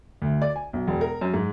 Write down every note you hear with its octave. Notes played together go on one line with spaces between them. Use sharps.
D2
D5
G#5
B1
E1
A#4
F#2
G#2